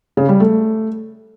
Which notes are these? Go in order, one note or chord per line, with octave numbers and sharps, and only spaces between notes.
C#3
G3
A3